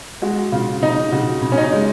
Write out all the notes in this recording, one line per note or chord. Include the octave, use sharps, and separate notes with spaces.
G#3 F#4
C#3 F4
C#3 D#4
C#3 F#4
C#3
C#4
D#4
G#3